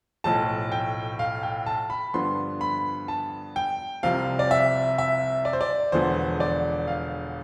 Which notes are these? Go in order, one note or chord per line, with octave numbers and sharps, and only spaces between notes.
B1 A2 F3 A3 A5
G5
F5
G5
A5
B5
G2 D3 F3 B3 C6
B5
A5
G5
C2 C3 F3 C4 F5
D5
E5
E5
D5
C5
D5
E1 E2 D3 F3 B3 C5
D5
F5